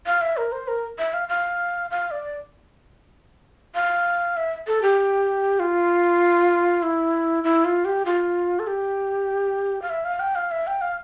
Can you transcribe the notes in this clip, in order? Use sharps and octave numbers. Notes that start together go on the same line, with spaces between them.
F5
E5
A#4
C5
A#4
E5
F5
F5
F5
D5
F5
E5
A4
G4
F4
E4
E4
F4
G4
F4
A4
G4
F5
E5
F5
G5
F5
E5
G5
F5